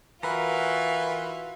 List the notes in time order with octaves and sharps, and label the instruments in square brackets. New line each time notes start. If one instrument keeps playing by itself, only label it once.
[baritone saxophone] E3 [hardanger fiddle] F4 F#4 [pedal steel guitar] A#4 B4 A#5